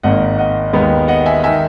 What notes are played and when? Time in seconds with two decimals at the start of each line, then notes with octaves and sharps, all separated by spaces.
0.03 G#1 G#2 D#3 A#3 D#5 F#5
0.38 D#5 F#5
0.73 D#2 D#3 G#3 B3
1.08 D#5 F#5
1.26 E5 G#5
1.44 D#3 E5 G#5